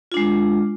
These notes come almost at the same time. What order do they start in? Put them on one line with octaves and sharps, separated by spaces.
F4 D4 G#3